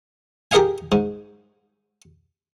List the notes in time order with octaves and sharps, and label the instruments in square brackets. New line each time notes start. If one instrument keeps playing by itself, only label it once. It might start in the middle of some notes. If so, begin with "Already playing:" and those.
[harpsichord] G4 G#4 A#4 D#5 F5 G#5
G#2